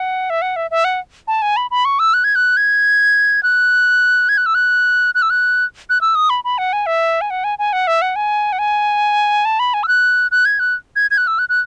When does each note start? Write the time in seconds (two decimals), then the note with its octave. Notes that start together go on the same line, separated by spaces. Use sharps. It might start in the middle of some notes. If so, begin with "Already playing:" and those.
Already playing: F#5
0.30 E5
0.42 F#5
0.56 E5
0.71 E5
0.85 F#5
1.28 A5
1.42 G#5
1.57 B5
1.71 B5
1.85 C#6
1.99 E6
2.14 F#6
2.24 G#6
2.35 F#6
2.57 G#6
3.43 F#6
4.29 G#6
4.38 F#6
4.46 E6
4.55 F#6
5.15 F#6
5.22 E6
5.30 F#6
5.90 F#6
6.01 E6
6.15 D#6
6.30 B5
6.44 B5
6.58 F#5
6.73 G#5
6.86 E5
7.21 G#5
7.30 F#5
7.44 G#5
7.59 G#5
7.73 F#5
7.87 E5
8.02 F#5
8.16 G#5
8.53 F#5
8.59 G#5
9.45 A5
9.59 B5
9.74 G#5
9.83 E6
9.88 F#6
10.31 F#6
10.45 G#6
10.59 F#6
10.96 G#6
11.11 G#6
11.18 F#6
11.27 E6
11.39 F#6
11.49 F#6